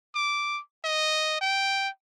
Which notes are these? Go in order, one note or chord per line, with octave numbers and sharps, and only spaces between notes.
D6
D#5
G5